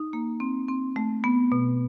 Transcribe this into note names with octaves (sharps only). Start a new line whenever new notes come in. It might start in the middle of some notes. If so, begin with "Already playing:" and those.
Already playing: D#4
A#3
C4
C4
A3
B3
B2